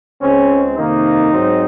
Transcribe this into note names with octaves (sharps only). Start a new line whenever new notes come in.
C#2 C#3 G#3 C4 C#4
F2 C3 D#3 A#3 D#4
G#2 F#3 C4